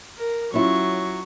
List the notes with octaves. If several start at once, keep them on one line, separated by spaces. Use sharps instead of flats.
A#4
F#3 C#4 E4 F4 C#6